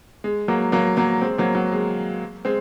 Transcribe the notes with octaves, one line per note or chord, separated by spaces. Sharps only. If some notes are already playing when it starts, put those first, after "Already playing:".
G#3
F#3 A#3
F#3 A#3
F#3 A#3
G#3 C4
F#3 A#3
F#3
G#3
G#3 C4